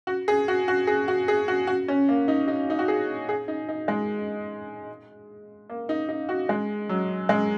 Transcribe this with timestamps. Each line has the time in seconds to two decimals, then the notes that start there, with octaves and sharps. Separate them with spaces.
0.07 F#4
0.28 G#4
0.48 F#4
0.68 F#4
0.87 G#4
1.08 F#4
1.28 G#4
1.48 F#4
1.67 F#4
1.88 C#4
2.09 A#3
2.28 D#4
2.48 D#4
2.70 D#4
2.79 F#4
2.88 G#4
3.29 G#4
3.48 D#4
3.69 D#4
3.88 G#3
5.70 A#3
5.89 D#4
6.09 D#4
6.29 F#4
6.49 G#3
6.89 F#3
7.29 G#3